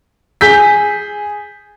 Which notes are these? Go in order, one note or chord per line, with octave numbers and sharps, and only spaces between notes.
G#4 G6 B6